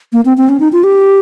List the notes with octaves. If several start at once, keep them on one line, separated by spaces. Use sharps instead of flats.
A#3
C4
C4
C#4
D#4
F4
G4